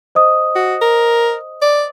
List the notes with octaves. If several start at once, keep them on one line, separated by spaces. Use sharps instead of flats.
C5 D#5 D#6
F#4
A#4
D5